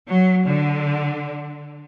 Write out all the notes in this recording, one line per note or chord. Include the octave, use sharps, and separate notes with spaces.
F#3
D3